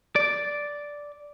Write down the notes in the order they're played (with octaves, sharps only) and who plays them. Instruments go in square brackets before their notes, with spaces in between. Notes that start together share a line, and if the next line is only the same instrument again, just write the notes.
[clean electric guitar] D5